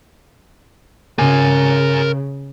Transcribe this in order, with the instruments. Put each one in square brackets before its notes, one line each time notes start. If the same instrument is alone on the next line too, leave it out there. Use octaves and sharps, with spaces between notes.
[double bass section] C#3 [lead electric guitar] A#4 G#5